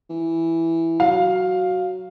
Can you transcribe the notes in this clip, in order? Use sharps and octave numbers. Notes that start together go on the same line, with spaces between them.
E3
F#3 F5